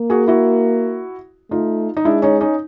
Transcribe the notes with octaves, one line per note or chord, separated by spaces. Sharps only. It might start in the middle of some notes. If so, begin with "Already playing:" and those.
Already playing: A#3
F#4 G#4
E4 F#4
A3 D#4 F4
D#4
G#3 D4 E4
C#4 D#4
C#4 D#4